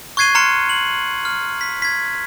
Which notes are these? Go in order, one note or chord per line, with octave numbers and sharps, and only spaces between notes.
C#6 F#6 G#6 C7 D#7 G7
A#5 C6 F6 F#6 C#7
F#7
F6
B6
G#6 B6